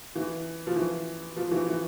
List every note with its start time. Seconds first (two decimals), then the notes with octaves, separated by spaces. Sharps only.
0.15 E3
0.67 F3
0.76 E3
1.36 F3
1.51 E3
1.67 E3